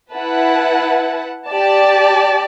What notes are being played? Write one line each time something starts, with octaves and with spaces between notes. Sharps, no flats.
E4 B4 F#5 A5
G4 D5 A5